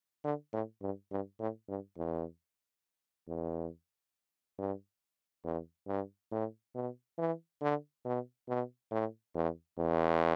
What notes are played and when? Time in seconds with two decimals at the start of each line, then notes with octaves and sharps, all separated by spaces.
0.24 D3
0.53 A2
0.82 G2
1.11 G2
1.40 A2
1.69 G2
1.98 E2
3.28 E2
4.59 G2
5.44 E2
5.87 G2
6.32 A2
6.75 B2
7.18 E3
7.61 D3
8.05 B2
8.48 B2
8.92 A2
9.35 E2
9.78 E2